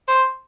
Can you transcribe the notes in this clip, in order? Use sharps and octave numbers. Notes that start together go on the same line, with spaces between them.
C5